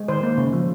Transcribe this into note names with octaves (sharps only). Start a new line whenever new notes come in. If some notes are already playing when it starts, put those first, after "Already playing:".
Already playing: G#3
D#3 C5
A#3
C#3
F3